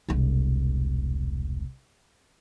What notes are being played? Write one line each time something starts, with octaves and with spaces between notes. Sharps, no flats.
E1 C2